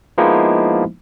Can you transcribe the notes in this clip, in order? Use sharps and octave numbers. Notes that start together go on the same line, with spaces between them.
F3 G#3 A#3 B3 D#4 E4